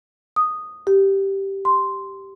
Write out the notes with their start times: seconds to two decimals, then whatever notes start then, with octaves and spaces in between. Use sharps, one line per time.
0.36 D#6
0.87 G4
1.65 C6